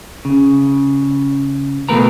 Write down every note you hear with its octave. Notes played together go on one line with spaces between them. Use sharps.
C#3
E2 B2 A3 A#4 B4 A#5